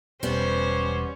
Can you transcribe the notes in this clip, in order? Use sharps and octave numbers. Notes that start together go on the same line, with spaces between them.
E1 B2 G3 B3 C#4 G4 C5